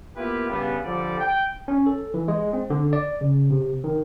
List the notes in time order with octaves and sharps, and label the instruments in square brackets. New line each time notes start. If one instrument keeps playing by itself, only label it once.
[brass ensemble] A#3 B3 E4 F4 G4 B4
G2 C#3 G3 B3
D3 F3 G3 A4 D5
G5
[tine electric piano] C#4
A4
E3
G#3
C4
D3
D5
C#3
C3
D#3